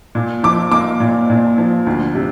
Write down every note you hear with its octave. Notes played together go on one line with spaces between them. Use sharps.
A#2
F3 D6
A#3 D6
A#2
A#2
F3
D2
C3